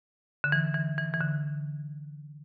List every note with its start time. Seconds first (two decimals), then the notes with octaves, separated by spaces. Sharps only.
0.44 D3
0.52 E3
0.75 E3
0.98 E3
1.14 E3
1.21 D3